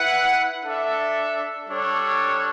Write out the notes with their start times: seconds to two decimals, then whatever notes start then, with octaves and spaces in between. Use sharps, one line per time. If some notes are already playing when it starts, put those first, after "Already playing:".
Already playing: E4 B4 F#5
0.63 D4 A4 E5
1.68 G3 D4 A4 C#5